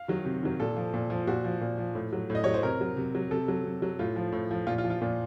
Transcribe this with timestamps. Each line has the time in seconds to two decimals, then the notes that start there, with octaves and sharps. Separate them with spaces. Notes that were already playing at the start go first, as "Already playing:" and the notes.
Already playing: F5
0.08 D#3 F#3
0.25 C3
0.43 D#3 F#3
0.60 A#2 A4
0.77 F3
0.94 A#2
1.10 F3
1.27 A#2 F#4
1.44 F3
1.61 A#2
1.78 F3
1.95 A2
2.13 F#3
2.30 A2
2.35 D#5
2.44 F#3 C#5
2.54 C5
2.63 C3 A#4
2.81 F#3
2.97 C3
3.15 F#3
3.31 C3 A4
3.48 F#3
3.65 C3
3.82 F#3
3.99 A2 F4
4.16 F3
4.32 A2
4.51 F3
4.67 A#2 F4
4.78 F4
4.84 F3
4.90 F4
5.01 A#2